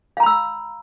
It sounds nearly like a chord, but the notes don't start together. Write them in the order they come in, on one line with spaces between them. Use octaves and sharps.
F5 A#5 B5 E6